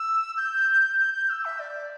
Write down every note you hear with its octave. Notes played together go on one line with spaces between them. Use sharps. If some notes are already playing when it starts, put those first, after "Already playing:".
Already playing: E6
G6
G6
G6
E6
E5
D5